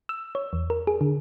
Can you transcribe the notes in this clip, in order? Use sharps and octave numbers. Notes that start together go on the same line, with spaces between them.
E6
C#5
E2
A#4
G#4
D3